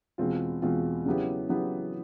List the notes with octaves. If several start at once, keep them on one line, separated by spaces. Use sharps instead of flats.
E2 B2 G#3 C4 F4
E2 B2 G#3 C4 F4
C#3 F#3 B3 E4 G4
C#3 F#3 B3 E4 G4